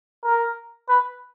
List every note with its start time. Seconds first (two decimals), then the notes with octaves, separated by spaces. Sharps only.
0.24 A#4
0.89 B4